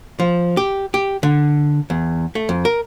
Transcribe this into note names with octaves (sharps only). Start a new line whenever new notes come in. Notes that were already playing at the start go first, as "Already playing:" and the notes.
F3
G4
G4
D3
E2
A3
F2
A#4